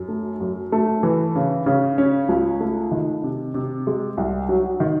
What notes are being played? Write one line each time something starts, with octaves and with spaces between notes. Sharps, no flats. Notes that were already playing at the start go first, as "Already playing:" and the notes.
Already playing: F#2
A3
F#2
A3
E3
C#3
C#3
C#4
C#2
A3
D#3
C3
C3
G#3
C2
F#3
D#3